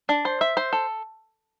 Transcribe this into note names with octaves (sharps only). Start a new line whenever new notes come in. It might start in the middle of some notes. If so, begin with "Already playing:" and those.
D4
C5
E5
C5
A4